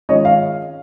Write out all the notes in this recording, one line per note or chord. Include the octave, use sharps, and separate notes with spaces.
D#3 G#3 C#4 F4 C#5 D#5
F5